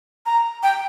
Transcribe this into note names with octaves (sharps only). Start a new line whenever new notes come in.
A#5
G5